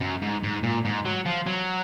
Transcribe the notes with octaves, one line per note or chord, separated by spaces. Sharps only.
F#2
G#2
G#2
A#2
G#2
F#3
F3
F#3